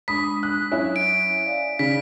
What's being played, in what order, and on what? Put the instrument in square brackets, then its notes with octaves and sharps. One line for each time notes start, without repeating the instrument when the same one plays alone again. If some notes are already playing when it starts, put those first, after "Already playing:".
[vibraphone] G#3 D4 [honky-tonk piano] B5 D#6 [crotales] B6
[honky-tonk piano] F#6
[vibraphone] F#3 [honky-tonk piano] C#4 E4
[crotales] D7
[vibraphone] D5 F5 G#5
[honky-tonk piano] C#3 [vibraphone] D5 [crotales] B6